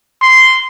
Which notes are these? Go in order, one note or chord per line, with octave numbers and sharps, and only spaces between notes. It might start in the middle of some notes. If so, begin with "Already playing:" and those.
C6